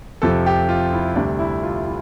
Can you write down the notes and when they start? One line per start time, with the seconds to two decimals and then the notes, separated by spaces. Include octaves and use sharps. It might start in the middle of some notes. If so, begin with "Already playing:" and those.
0.22 F2 C3 F3 A4
0.46 G4
0.69 F4
0.93 E4
1.16 D2 C3 G3 D4
1.39 E4
1.63 F4
1.86 E4